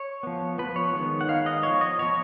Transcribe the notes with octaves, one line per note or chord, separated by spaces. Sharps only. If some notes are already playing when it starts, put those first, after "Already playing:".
Already playing: C#5
F3 B3
F3 B3 B4
C#5
D#3 G#3 B3
F#5
D#3 G#3 B3 F5
D#5
F3 B3 C#5
D#5
F3 B3 C#5